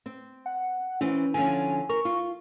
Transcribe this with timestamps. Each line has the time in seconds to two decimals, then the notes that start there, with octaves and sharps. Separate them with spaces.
0.06 C4
0.46 F#5
1.01 E3 C4 C#4 C5
1.34 D3 F3 C#4 G#5
1.89 A#4 C#6
2.05 F4